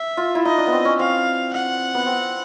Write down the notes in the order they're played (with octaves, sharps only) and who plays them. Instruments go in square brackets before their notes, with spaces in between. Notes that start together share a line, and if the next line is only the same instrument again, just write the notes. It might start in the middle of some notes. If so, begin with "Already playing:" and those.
Already playing: [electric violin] E5
[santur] F4
E4
[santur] D#4 [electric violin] D#5
[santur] D4
B3
C4
C#4
[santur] C4 [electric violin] F5
[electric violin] F#5
[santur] B3
C4